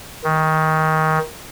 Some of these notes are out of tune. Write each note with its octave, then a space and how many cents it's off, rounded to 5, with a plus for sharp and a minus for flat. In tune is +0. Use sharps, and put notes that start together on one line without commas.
D#3 +20